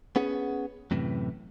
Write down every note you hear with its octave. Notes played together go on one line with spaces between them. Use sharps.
B3 C#4 G#4 F#5
F#2 A2 C3 E3